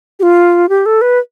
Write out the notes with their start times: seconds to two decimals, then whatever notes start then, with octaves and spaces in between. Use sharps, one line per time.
0.20 G4
0.23 F4
0.69 G4
0.86 A4
1.01 B4